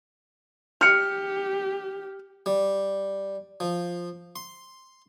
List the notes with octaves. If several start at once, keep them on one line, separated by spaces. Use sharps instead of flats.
G4 F6 C#7
G3
F3
C6